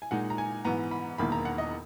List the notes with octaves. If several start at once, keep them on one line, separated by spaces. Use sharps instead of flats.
G#5
A#2 G#3 D#4 F#5
A#5
G#5
G#2 E3 B3 A#5
B5
E1 E2 D#3 A#3 B5
A#5
F#5
D#5